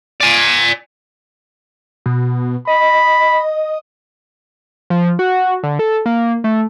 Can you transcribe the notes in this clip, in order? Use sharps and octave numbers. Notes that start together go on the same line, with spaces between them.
D5 G#5
B2
D#5 B5
F3
F#4
D3
A4
A#3
A3